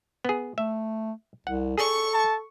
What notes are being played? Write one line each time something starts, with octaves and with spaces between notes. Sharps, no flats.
B3 G#4
A3 E5
C2 F#5
G#4 A4 C#6
A5